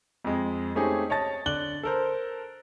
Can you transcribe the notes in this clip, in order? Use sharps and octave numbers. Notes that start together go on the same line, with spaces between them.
F2 G#3
A3 C4 C#4 D#4 G4 G#4
C#5 D#5 A5 A6
D3 D5 F#6 F#7 G7
A4 A#4 C5